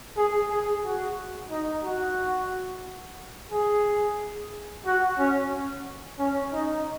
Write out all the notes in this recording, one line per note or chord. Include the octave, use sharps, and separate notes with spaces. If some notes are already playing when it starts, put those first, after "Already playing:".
G#4
G#4
F#4
D#4
F#4
G#4
F#4
C#4
C#4
D#4